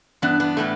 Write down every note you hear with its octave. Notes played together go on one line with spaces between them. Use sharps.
G2 E3 B3 D4
B3 D4
A2 E3 A3